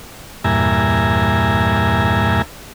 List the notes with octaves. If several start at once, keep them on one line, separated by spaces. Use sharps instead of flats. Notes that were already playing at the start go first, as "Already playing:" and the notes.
E2 G2 A#2 E5 G#5 A#5